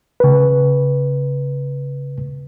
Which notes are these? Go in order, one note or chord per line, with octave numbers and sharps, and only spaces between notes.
C#3 B4